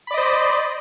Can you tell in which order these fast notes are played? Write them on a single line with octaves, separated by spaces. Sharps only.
B5 D5 D#5 C5